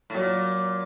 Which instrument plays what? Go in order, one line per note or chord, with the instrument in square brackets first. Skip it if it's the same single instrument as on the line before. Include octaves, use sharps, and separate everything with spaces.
[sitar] A2
[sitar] A#2 [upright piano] F#3